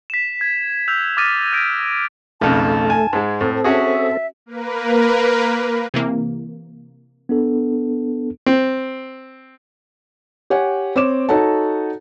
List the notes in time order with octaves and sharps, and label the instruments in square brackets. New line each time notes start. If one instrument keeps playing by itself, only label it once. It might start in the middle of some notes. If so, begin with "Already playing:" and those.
[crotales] B6 E7
G#6
E6 F#6 G6 F7
D6 D#6 F6 A6 A#6 D#7
G6 G#6 A#6 D7 D#7
[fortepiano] B1 F2 C#3 [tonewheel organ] A3 [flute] A5
[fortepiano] G#5
G#2 G#3
[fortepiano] A2 [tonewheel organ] C4 A4
[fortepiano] C#4 F#4 G#4 [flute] E5
[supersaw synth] A#3 A#4 B4
[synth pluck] C3 E3 A#3
[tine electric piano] B3 D4 A4
[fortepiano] C4
[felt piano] G4 C#5 F#5 G#5
C4 C#5 D6 E7
D#4 F#4 A4 C#5 F#5 A5